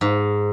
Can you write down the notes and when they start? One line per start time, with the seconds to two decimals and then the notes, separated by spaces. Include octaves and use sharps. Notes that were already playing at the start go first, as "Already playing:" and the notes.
0.01 G#2